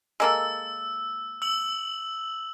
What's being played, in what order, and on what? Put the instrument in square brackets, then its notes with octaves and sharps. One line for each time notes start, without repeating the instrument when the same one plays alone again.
[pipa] G#3 A#3 A4 [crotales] E6
[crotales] E6 F#7